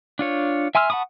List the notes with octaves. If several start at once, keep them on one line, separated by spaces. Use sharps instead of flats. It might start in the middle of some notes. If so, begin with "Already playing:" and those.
D4 F4 C#5
E5 G#5 C6 E6 F6
F#5 A5 B5 C#6 D#6